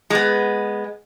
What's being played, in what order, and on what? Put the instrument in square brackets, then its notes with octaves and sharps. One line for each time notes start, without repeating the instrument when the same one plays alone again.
[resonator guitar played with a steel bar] G#3 B3